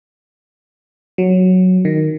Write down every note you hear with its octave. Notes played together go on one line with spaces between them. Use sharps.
F#3
D#3